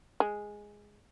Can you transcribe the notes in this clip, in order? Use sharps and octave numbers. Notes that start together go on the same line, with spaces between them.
G#3